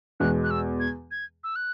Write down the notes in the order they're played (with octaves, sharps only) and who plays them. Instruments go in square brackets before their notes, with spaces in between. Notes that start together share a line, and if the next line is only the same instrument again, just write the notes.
[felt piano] E2 B2 G#3 [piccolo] F#6
[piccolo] F#6
E6
G#6
G#6
E6
F#6